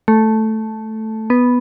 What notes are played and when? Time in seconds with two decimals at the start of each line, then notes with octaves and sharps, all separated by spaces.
0.08 A3
1.30 B3